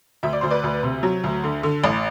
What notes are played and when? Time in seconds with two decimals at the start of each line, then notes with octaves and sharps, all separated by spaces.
0.23 D2 E5
0.33 D5
0.41 D2 C5
0.50 B4 D5
0.63 D2
0.83 C3
1.03 F#3
1.24 D2
1.44 D3
1.63 D3
1.84 A1